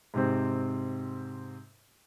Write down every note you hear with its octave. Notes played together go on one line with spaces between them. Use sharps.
G#2 C3 C4